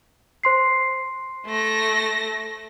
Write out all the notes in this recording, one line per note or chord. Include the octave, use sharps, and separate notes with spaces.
C5 C6 C7
A3 A#6